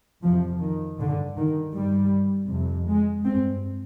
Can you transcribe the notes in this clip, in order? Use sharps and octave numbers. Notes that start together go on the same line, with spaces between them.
F2 C3 F3
D#3
G2 D3
D#3
G2 G3
F2 C3
G#3
G2 C4